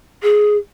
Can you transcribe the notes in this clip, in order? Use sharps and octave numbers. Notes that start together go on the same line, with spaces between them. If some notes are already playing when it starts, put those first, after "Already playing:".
G#4